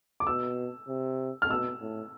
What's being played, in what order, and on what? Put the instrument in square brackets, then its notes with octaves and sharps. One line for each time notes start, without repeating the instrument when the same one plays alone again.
[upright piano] D6
[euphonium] B2 [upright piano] E6
[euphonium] C3
[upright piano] F6
[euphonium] B2 [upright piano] E6
[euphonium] A2